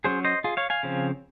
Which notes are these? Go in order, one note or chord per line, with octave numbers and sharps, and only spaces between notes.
F#3 C#4 G#4 C5
C5 D#5
F4 G#4
C#5 F5
F5 G#5
C#3 F3 C4